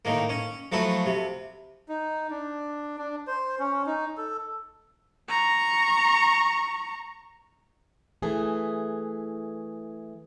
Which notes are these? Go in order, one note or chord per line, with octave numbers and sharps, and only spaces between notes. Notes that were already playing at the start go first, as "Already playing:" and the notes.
A2 D#3 A#3
C#4
F3 F#3 A3 E4 B4
C3
D#4
D4
D4
C5
C#4
D#4
A4
A#5 C#6
E3 A3 G#4